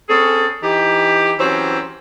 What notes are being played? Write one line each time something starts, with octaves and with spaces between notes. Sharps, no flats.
C4 C#4 G#4 A4
E3 D#4 G4
E3 F#3 C4 C#4 G4